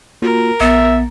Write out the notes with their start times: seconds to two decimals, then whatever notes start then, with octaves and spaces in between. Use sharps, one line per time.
0.22 A#3 F4 F#4 A#4
0.61 A#1 B3 E5 A6